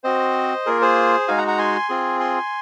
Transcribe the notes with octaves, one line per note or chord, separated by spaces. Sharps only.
C4 F#4 C5 D#5
A#3 F4 G#4 A#4
G#4 C5
G#3 D#4 F#4 F5 G#5
F#5 A#5
F#5 A#5
G#5 C6
C4 F4 G#4
G#5 C6